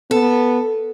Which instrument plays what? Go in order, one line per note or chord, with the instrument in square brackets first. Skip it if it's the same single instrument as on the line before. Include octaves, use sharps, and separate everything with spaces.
[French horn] B3 [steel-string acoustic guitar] A4